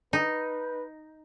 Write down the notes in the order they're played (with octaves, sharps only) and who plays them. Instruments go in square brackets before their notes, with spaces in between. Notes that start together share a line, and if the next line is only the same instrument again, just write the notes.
[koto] D#4 [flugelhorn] B4